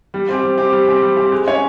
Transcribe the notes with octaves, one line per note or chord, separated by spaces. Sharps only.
G3
C4 G4
G3
C4 G4
G3
C4 G4
G3
C4 G4
G#3
C#4 G#4 C#5